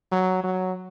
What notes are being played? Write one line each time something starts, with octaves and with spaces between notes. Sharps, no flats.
F#3
F#3